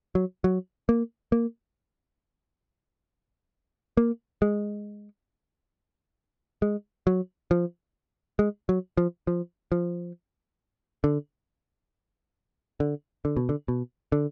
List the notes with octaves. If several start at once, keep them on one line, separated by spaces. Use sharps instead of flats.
F#3
F#3
A#3
A#3
A#3
G#3
G#3
F#3
F3
G#3
F#3
F3
F3
F3
D3
D3
D3
B2
D3
B2
D3